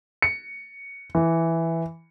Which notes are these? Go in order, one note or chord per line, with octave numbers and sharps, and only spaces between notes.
C#7
E3